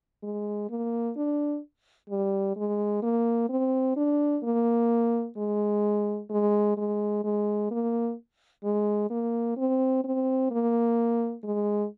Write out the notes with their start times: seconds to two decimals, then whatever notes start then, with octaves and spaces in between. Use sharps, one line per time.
0.23 G#3
0.69 A#3
1.16 D4
2.10 G3
2.56 G#3
3.02 A#3
3.49 C4
3.96 D4
4.44 A#3
5.37 G#3
6.30 G#3
6.77 G#3
7.24 G#3
7.71 A#3
8.64 G#3
9.10 A#3
9.57 C4
10.04 C4
10.51 A#3
11.44 G#3